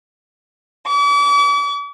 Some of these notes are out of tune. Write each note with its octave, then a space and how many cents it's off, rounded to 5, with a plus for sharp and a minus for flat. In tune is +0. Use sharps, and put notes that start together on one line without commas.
D6 -45